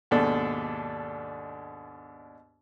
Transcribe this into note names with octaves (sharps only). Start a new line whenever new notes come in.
D#2 G#2 B2 D4 A4